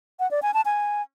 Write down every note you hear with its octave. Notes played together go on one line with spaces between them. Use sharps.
F#5
D5
G#5
A5
G#5